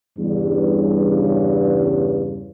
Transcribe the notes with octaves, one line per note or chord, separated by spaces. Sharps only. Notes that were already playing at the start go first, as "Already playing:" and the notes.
E2 G2 C#3